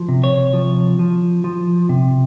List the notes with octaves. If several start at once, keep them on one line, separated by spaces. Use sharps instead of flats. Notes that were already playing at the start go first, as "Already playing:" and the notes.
Already playing: F3
C3
C#5
F3
F3
F3
C3